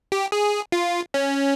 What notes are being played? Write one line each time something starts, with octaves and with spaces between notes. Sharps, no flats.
G4
G#4
F4
C#4